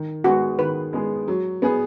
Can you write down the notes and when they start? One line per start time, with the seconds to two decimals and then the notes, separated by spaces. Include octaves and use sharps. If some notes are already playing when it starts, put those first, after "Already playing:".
Already playing: D#3
0.24 G#3 B3 F#4 G#4
0.59 D#3 B4
0.93 G#3 B3 G#4
1.28 F#3
1.62 B3 G#4 B4